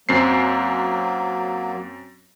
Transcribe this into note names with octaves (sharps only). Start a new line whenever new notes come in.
F#2 F#3 A#3 C4 C7